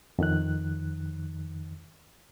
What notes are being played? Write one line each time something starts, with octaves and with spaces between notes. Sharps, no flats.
F2 D#3 F#6